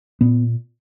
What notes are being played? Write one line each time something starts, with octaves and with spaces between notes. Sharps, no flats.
A#2 B3